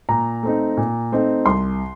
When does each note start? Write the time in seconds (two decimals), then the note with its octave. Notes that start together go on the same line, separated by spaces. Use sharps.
0.09 A#2 A#5
0.43 A3 C4 D#4
0.77 A#2
1.12 A3 C4 D#4
1.46 C2 C6